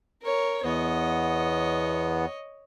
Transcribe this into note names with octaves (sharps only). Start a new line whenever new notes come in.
A#4 C#5
E2 B3 C#5 D#5